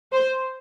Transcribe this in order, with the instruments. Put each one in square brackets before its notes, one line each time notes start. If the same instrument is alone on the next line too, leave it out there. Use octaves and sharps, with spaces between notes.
[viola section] C5